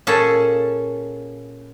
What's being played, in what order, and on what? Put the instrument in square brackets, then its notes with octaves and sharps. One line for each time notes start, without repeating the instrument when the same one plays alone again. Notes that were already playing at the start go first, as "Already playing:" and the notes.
[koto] A#2 C#4 G#4 A4